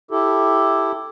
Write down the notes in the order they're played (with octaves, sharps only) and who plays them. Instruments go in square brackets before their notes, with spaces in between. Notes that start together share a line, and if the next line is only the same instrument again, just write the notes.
[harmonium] E4 G4 A4